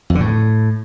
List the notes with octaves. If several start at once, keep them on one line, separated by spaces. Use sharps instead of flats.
F2
D3
A2